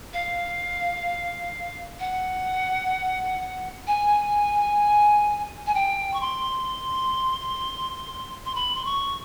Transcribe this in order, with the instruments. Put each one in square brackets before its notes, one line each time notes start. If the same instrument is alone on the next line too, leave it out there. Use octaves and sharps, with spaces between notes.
[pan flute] F5
F#5
G#5
G#5
G5
C#6
C6
C6
B5
C6
C#6